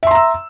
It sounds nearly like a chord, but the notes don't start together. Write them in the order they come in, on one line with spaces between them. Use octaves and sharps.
E5 C6 A#5 E6